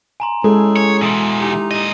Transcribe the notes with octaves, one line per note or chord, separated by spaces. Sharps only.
G#5 A#5 C6
A2 C#3 G#3 G#4 A4
C#5
B2 E3 C6 D#6 E6
D#4 E4 G4
A#2 D#5